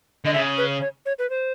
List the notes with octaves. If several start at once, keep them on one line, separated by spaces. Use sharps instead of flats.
D3 D#5
C#3 E5
B4
C#5
C#5
B4
C5